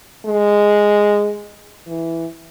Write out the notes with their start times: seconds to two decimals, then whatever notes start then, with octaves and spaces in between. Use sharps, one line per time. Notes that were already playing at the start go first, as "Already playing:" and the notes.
0.27 G#3
1.89 E3